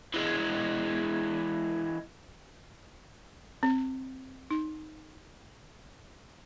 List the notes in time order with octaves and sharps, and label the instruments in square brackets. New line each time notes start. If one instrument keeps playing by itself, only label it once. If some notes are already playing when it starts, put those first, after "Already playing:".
[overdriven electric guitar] E3 G#3
[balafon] C4
D#4